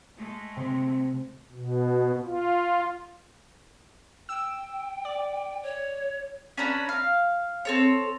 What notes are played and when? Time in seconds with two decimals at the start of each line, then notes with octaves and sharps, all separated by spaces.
0.17 G#3 A3
0.56 C3 C4 C6
1.52 B2
2.25 F4
4.29 G5 E6
5.05 D5
5.63 C#5
6.57 C#4 D4 B4 A#5
6.89 F5
7.65 C4 A4 C#5